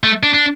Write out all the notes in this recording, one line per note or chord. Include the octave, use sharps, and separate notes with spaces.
A3
D4
D4